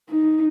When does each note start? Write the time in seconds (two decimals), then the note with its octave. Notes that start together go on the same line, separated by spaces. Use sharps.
0.10 D#4